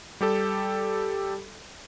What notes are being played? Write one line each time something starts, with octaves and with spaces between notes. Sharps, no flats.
G3 G4 A4